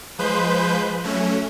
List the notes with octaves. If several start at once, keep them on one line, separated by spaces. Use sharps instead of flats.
F3 G#3 B4 C5 G6
F#3 A3 C#4